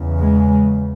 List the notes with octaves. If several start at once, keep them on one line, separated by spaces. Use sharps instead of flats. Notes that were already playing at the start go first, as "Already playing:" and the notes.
Already playing: E2 C#3
G#3